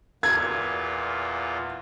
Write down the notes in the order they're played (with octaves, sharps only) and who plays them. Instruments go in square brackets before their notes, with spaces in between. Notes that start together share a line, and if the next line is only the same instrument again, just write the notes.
[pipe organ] E2 A#2 F4 [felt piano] G#6